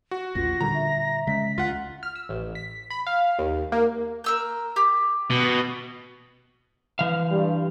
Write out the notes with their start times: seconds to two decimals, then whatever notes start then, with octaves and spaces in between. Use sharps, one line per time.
0.11 F#4
0.35 A1 D#2 F4 A#6
0.61 A#2 D3 G3 A#5
0.74 E5
1.27 C#3 G#3 B6
1.58 C#2 F4 F#5
2.03 F6
2.16 E6
2.29 A1
2.55 B6
2.90 B5
3.07 F5
3.39 D#2
3.72 A#3
4.24 A#4 E6 G6
4.76 G4
5.30 B2
6.99 E3 F5
7.31 G2 G3